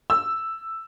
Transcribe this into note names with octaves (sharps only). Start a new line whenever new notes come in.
E6